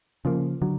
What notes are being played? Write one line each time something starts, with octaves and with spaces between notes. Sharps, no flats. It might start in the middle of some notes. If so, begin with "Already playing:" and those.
C#3 F3 A#3
D3 F#3